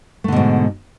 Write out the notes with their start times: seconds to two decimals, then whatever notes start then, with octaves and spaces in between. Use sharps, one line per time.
0.24 A3
0.28 D3
0.32 B2
0.36 G#2